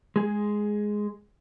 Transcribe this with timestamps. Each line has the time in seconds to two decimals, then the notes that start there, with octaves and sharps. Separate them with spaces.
0.16 G#3 G#4